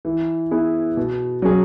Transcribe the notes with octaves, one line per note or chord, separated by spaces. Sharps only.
E3
B3 E4 G#4 B4
B2
F#3 C#4 G#4